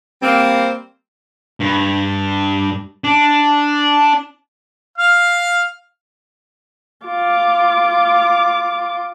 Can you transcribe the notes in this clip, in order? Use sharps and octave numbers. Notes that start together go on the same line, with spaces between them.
G3 A#3 C4
G2
D4
F5 F6
F4 D6